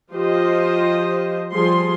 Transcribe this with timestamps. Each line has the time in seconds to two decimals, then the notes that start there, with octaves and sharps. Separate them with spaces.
0.12 F3 F4 G4 C5 D#5
1.52 F3 G3 G#4 C6